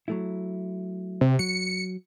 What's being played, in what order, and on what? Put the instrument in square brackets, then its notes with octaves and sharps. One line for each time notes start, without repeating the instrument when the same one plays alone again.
[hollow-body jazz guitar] F#3 A3 E4
[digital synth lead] C3
[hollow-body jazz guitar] F#3 [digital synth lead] C#7